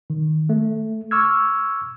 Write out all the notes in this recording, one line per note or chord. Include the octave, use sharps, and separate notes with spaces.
D#3
A3
C#6 D6 E6 F6 G#6